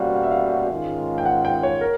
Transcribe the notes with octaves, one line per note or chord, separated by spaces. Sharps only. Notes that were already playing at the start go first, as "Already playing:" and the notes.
Already playing: B2 G3 A#3 C#4 F#4 C5 F5
F5
E5
F5
G#2 D#3 G#3 C#4 F4
G5
F#5
G5
C#5
A#4